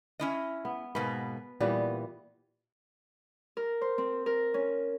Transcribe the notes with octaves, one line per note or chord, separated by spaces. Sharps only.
C#4 E4 D#5
B3
G#2 B2 A#3 B4
A#2 E3 G3 B3
A#4
C5
C4
A#4
C#4